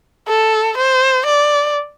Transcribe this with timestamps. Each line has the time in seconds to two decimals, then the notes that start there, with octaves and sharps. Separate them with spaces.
0.28 A4
0.77 C5
1.26 D5